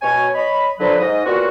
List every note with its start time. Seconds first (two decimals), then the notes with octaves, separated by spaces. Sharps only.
0.02 B2 C#5 G#5
0.35 C#5 D#5 B5
0.80 D3 F3 F#3 B4
1.00 G#2 D#5
1.25 G3 A#3 B3 C#4 F4 F#4